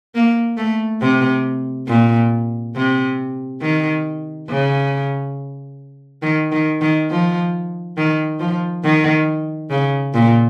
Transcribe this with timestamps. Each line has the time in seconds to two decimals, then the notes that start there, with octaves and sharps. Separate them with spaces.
0.15 A#3
0.57 A3
1.01 C3
1.88 A#2
2.76 C3
3.62 D#3
4.49 C#3
6.23 D#3
6.52 D#3
6.81 D#3
7.10 F3
7.97 D#3
8.40 F3
8.84 D#3
9.70 C#3
10.14 A#2